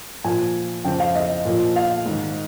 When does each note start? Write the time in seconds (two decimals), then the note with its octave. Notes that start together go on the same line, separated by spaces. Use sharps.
0.24 A#2 F3 G#5
0.85 F2 C#3 F3 G5
1.00 F5
1.15 D#5
1.45 A#2 F3
1.76 F5
2.06 G#2 D#3